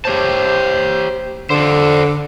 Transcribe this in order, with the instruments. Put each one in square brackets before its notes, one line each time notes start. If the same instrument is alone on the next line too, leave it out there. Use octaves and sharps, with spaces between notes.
[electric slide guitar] G4 C#5 A5 [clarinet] C5
[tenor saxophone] D3 [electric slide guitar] A4 C5